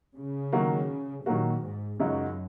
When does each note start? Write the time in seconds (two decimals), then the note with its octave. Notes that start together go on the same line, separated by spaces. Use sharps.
0.17 C#3
0.52 D#3 F#3 A#3 F#4
1.26 A#2 D#3 F#3 A#3 F#4
1.63 G#2
2.00 C#2 F#2 C#3 F#3 D#4 F#4